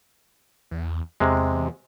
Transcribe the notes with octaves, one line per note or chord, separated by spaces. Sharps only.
E2
E2 C3 G#3